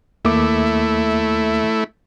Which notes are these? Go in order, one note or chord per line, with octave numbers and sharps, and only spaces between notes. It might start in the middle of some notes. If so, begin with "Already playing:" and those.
D#2 A3 A#3 E4 D6